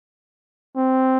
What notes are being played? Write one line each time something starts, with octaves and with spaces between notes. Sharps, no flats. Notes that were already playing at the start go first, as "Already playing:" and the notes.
C4